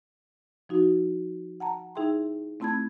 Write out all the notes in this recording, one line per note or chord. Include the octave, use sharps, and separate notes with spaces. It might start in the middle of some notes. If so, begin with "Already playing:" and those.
F3 D#4 F#4
F#5 A5 A#5
D#4 E4 G#4 E5 G5 C6
A3 C4 E4 A5 B5 G#6